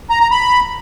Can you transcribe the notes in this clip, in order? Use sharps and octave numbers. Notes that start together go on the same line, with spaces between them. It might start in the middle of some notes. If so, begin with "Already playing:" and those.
A#5
A#5
B5